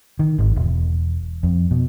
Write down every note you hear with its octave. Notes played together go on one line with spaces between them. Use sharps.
D#3
G#1
E1
F2
B2